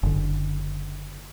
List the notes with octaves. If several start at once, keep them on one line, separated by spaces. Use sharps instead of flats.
F#1 D3